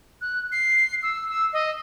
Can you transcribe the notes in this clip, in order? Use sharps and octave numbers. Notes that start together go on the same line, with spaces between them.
F#6
C7
E6
E6
D#5